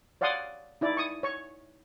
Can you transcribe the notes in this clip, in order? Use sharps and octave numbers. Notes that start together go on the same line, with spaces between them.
C#5 D5 F5 F#5 C6 D#6
D#4 E4 D5
C#6 D#6
C#5 C#6